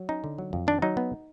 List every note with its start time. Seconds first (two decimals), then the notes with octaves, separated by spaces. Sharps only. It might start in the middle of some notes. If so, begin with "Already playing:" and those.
Already playing: F#3
0.09 C#4 D#4
0.24 D3
0.38 F#3
0.53 F2
0.67 D#3 D4
0.82 F#3 D#4
0.97 B3